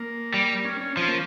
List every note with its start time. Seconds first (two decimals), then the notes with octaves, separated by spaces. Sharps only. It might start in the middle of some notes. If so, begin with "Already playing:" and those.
Already playing: A#3
0.34 G3
0.65 C#4
0.81 C#4
0.97 F3 C#4
1.08 A#3